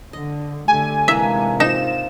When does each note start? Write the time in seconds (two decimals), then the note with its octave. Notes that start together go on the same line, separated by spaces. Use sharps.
0.13 D3 D#5
0.68 D3 A3 G4 G#5
1.08 G#2 C3 E3 G#3 A#3 D4 E5
1.60 C4 D#4 F4 E7